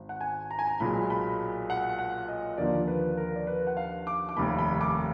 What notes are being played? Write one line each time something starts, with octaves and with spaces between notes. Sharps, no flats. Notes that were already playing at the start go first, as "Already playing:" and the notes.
Already playing: G#1
F#5
G#5
A#5
G#5
A#5
B1 A#2 G#3 B5
B5
F#5
F#5
D#5
D#2 D3 F3 A#3 D5
B4
A#4
D5
B4
F#5
F5
D6
D6
F1 D#2 D#3 A#3 B5
B5
D6